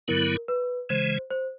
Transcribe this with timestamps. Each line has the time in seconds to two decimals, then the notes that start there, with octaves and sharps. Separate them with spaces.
0.08 G2 D3 F#3 B3 E4 A#4
0.48 B4
0.90 C#3 E3 G#3 C5
1.31 C5